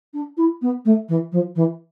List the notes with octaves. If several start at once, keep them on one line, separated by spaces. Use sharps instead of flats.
D4
E4
B3
A3
E3
F3
E3